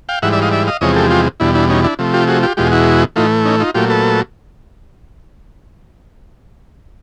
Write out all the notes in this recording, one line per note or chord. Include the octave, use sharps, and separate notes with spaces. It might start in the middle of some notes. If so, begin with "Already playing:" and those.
F5 G5
G#2 E3 G3 E5 F#5
D5 E5
D#5 F5
D5 E5
D#5 F5
E2 C3 F3 G#3 C#5 D#5
G4 A4
F4 G4
E2 B2 G3 D4 E4
D4 E4
C#4 D#4
D4 E4
C3 F3 A3
F4 G4
F#4 G#4
F4 G4
E2 B2 G#3 F4 G4
E4 F#4
A2 E3 A3 D#4 F4
C#4 D#4
D#4 F4
A#2 F#3 A3 F4 G4
A4 B4